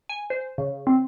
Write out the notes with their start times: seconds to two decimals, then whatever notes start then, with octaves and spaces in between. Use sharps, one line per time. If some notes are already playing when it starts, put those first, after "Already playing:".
0.09 G#5
0.30 C5
0.58 C#3
0.87 C4